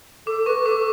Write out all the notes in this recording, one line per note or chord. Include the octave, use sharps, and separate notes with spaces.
A4 D6
B4 C#6
A4 D6